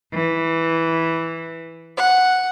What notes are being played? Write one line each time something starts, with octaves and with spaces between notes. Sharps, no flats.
E3
F#5